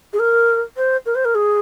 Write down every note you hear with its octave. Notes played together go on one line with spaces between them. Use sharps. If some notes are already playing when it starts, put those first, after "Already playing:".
G#4
A#4
C5
A#4
C5
A#4
G#4